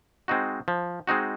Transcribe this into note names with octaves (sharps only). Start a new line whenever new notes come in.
G#3 C4 D#4 F#4
F3
G#3 C4 D#4 F#4